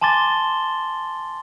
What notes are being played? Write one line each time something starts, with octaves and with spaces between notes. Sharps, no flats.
G#5 A5 C6 D6 A6 G7